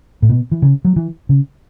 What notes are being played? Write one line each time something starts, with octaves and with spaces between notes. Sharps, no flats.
A2
B2
E3
C#3
F#3
E3
C#3